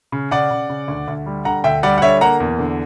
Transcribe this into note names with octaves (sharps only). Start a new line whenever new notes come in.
C#3
C#3 D5 F#5
C#3
C#3
D2
D2
G3
D3 F#5 A#5
D2 E5 G5
G3 D5 F#5
F#5
D3 C#5 E5
A#3 F#5 A#5
E2
D3